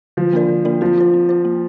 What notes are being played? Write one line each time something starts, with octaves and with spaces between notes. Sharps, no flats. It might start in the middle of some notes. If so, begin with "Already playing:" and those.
D3 F3
A#3 D4 A#4 D5
D3
A#3 D4 A#4 D5
F3 C4
F4 C5
C4
F4 C5
A#3